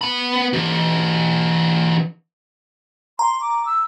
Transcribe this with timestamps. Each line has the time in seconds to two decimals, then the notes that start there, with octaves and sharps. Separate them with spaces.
0.01 B3 B5
0.53 E3 G4
3.19 A#5 C6
3.41 D6
3.66 E6